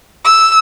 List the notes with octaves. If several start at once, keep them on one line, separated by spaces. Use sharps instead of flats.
E6